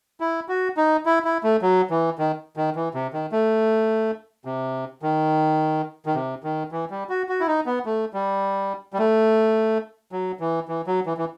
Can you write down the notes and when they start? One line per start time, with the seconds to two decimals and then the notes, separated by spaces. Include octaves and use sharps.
0.20 E4
0.49 F#4
0.77 D#4
1.06 E4
1.25 E4
1.43 A3
1.62 F#3
1.90 E3
2.19 D#3
2.57 D#3
2.75 E3
2.94 C3
3.13 D#3
3.32 A3
4.45 C3
5.02 D#3
6.06 D#3
6.15 C3
6.44 D#3
6.72 E3
6.90 G3
7.09 F#4
7.29 F#4
7.40 E4
7.47 D#4
7.66 B3
7.85 A3
8.13 G3
8.93 G3
8.99 A3
10.12 F#3
10.40 E3
10.68 E3
10.87 F#3
11.06 E3
11.17 E3